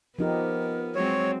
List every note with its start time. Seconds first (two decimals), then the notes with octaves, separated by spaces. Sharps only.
0.19 F3 B3 D#4 G4 A#4
0.95 F#3 G#3 C4 C#5